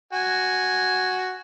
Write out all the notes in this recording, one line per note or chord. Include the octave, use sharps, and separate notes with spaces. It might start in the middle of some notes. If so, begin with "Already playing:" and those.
F#4 G#5